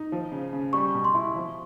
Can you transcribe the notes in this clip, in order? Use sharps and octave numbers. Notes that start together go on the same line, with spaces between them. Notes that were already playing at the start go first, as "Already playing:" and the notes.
Already playing: D#4
F3
C#3
C#3
G3 C#6
B2
C6
E4
F3